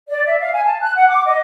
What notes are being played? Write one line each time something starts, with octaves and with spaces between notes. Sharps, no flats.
D5
E5
F5
G#5
A5
F#6
F#5
D6
D#5